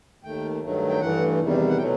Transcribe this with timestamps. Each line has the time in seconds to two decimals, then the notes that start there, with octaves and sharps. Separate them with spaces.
0.24 D#2 D#3 A3 G5
0.62 G2 D#3 F#3 A3
0.89 G5
1.01 G2 E3 A3 F#5
1.39 E2 C3 D#3 G3
1.69 F#5
1.78 B2 F#3 A3 G5